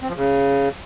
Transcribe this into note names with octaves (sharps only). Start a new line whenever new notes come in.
C4
F3
C#3